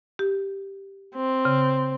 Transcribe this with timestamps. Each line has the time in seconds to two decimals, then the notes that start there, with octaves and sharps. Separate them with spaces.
0.19 G4
1.16 C4
1.45 C#3